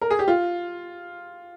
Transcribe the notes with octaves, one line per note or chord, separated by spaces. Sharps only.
A#4
G#4
G4
F4